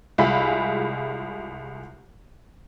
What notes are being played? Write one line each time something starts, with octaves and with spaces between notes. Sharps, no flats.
C2 G#3 F4 G#4 E5 B5